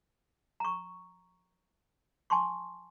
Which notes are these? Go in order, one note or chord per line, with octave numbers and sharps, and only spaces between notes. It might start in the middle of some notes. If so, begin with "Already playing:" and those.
A#5 C#6
G#5 A5 C6 C#6